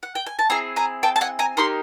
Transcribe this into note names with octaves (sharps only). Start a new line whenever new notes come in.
F#5
G5
G#5
A5
C4 E4 G#4 G#5 A#5
G#5 A#5
G5 A5
A5
F#5 G#5
G#5 A#5
A#3 D#4 G4 A#5 C6